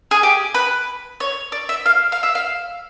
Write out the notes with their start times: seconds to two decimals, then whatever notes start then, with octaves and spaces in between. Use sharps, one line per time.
0.11 G#4
0.23 G4
0.55 B4
1.20 C#5
1.52 D5
1.69 E5
1.86 F5
2.12 F5
2.23 E5
2.35 F5